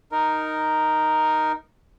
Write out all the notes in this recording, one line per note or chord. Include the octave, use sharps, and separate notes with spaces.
D#4 A#4